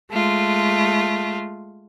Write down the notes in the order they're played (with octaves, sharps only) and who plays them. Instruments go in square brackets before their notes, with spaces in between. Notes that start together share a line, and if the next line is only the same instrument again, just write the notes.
[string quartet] G#3 A3 F4